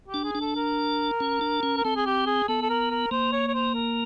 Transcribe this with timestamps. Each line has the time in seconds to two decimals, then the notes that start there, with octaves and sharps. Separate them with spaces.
0.08 G4
0.14 D4
0.24 G#4
0.35 D4
0.41 A4
0.56 A#4
1.20 C#4
1.41 D4
1.63 C#4
1.77 A#4
1.84 C4 A4
1.96 G#4
2.06 G4
2.26 G#4
2.48 B3 A4
2.62 A4
2.70 A#4
2.91 A#4
3.11 A#3 C5
3.32 C#5
3.48 C#5
3.54 C5
3.75 A#4